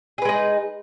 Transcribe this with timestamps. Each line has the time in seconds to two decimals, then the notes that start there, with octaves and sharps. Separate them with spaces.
0.18 G#4
0.22 B4
0.25 G#3
0.29 D#4